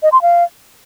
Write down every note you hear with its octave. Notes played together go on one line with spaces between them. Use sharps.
D#5
C6
F5